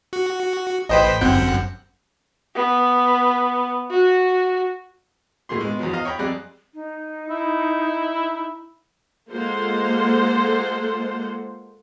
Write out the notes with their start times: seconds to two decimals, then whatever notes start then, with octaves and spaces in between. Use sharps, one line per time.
0.13 F#4
0.89 A1 B4 C5 D#5 G5 B6
1.21 G1 F#2 C4 F#5 G6
2.56 B3
3.91 F#4
5.49 A2 A#3 G#4 C6
5.61 G#3 B3
5.79 E2 F3 F#3
5.93 D#5 F5 A#5
6.05 C#5 G5 A#5 B5
6.19 F2 G3 G#4 D5 F#6
6.74 D#4
7.30 E4
9.30 G#3 A#3 F4 A4 C5 F#5